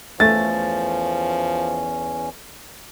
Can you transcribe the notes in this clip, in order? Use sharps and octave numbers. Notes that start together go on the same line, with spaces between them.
E2 F3 A3 C#4 A6